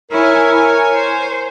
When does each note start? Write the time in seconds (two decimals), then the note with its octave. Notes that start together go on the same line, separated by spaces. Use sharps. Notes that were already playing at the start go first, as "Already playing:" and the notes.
0.11 E4 A#4 C#5 G#5
0.94 C5